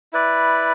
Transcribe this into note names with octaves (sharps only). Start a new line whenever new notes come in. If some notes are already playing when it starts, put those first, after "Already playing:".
E4 B4 D5